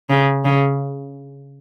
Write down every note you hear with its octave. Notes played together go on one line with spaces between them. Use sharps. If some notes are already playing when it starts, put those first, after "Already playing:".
C#3
C#3